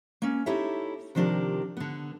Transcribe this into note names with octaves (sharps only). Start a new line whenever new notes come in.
A#3 C#4
D#4 E4 G4 A4 C#5 E5
C3 D#3 F3 D4 G4 A#4
D3 B3